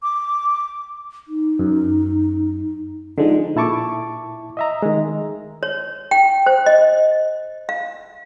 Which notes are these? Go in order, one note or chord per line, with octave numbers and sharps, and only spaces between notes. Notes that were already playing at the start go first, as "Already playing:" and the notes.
D6
D#4
F#2
D3 F3 G#3 D#4
A#2 E4 A5 C#6 D6
D#5 E5 A#5
D#3 G#3
C#5
G5
C5
D#5
F5